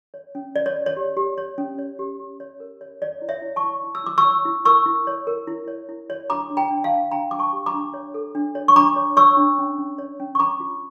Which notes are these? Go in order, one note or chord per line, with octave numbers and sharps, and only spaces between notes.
C#5
C#4
C#5 D5
C#5
C#5
C#5
G4
G4
C#5
C#4
C#5
G4
G4
C#5
A#4
C#5
C#5 D5
E4
C#5 E5
E4
A5 C#6
E4
E4
E6
E4 D6
C#6 E6
C#5
E4
A#4 C#6 E6
E4
C#5
A#4
E4
C#5
E4
C#5
D4 A#5 D6
D4
G5 A#5
D4
F5 A5
D4
D4 G5 A#5
D4 D6
A5 C#6
G4
A#5 D6
D4
C#5
A4
D4
C#5
C#6
D4 A#5 D6
C#5
C#5 C#6 E6
D4
C#4
C#4
C#5
C#4
C#6
C#4 A#5 D6
F4